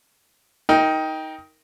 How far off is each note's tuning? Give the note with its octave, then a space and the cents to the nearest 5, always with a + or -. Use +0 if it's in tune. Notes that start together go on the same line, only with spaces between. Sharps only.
D#4 +20 A#4 +0 G5 +0